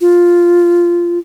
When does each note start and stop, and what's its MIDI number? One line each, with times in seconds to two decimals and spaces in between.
0.01 1.19 65